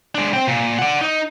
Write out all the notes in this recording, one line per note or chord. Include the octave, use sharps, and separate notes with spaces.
G#3 D4
C4 G5
A#2
D5 F#5
D#4